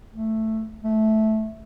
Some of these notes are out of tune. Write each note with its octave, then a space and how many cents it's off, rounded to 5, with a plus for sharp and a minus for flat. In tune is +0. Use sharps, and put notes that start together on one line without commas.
A3 +5
A3 -10